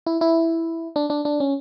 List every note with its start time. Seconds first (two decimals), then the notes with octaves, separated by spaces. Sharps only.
0.07 E4
0.21 E4
0.96 D4
1.10 D4
1.25 D4
1.40 C#4